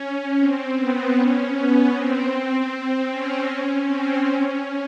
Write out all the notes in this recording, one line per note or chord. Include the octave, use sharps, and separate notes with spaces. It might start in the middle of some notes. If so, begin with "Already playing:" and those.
Already playing: C#4
C4
B3
C#4
B3
C4
C#4
C4
C#4